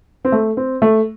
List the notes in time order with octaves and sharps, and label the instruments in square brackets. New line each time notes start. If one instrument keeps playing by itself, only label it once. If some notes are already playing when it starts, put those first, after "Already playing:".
[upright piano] C4
A3
C4
A3